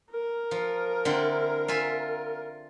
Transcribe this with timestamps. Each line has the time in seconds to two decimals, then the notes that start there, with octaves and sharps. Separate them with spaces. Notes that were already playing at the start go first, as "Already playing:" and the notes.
0.11 A#4
0.51 F3
1.05 D3 C4 E4
1.68 F4 E5 G#5